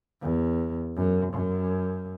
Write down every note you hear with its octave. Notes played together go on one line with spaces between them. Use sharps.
E2
F#2
F#2